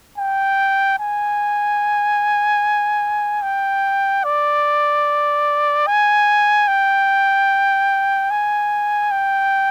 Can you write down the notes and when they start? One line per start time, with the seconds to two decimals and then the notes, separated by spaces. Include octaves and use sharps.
0.18 G5
0.99 G#5
3.43 G5
4.24 D5
5.87 G#5
6.68 G5
8.31 G#5
9.12 G5